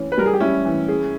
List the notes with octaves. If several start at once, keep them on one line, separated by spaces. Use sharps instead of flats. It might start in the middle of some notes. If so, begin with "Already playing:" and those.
Already playing: E3 C#4
B4
G3 A#4
G#4
G4
G3 C#4 E4
E3
G#4